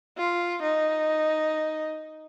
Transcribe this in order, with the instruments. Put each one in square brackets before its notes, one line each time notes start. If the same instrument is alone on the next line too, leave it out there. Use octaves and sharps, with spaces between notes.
[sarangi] F4
D#4